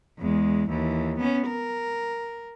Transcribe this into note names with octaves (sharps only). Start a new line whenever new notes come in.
E2 G#3
D#2 E3
B3 C#4
A#4